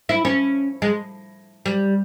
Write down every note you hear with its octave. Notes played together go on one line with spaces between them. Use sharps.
E4
C#4
G#3
G3